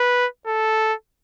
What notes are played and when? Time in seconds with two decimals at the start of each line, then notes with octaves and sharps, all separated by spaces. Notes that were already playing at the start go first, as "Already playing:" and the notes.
Already playing: B4
0.47 A4